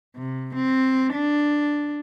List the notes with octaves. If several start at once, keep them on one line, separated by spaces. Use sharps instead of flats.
C3
C4
D4